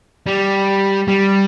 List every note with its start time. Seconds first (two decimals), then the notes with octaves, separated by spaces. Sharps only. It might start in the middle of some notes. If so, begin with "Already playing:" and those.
0.26 G3
1.08 G3